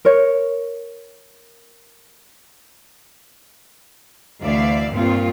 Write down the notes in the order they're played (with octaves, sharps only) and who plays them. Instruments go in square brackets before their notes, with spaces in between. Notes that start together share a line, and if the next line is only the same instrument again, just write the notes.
[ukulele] A#4 C#5
[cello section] D2 E3 D5 E5 F5
G2 A#2 C4 F4